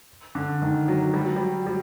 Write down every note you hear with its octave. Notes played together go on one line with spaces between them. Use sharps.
D3
D#3
F#3
G3
F#3
G3
G3